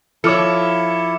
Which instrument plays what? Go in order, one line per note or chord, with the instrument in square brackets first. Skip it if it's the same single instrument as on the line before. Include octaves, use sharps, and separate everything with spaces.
[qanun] F3 [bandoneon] E4 [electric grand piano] A4 C#5 [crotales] D6 F6 C#7